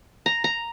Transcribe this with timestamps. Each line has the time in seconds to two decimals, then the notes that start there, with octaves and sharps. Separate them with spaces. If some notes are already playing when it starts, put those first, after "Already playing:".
0.26 A#5
0.44 A#5